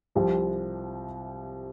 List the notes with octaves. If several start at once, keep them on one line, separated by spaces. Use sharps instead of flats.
C2 C3 F3 G4